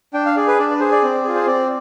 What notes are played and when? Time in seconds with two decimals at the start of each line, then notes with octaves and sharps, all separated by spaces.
0.14 D4 G5
0.26 F5
0.37 G#4 D5
0.48 B4
0.59 D4 D5
0.70 D5
0.80 G#4 C5
0.92 D5
1.03 C4
1.24 F4 G#4
1.35 C5
1.46 C4 D5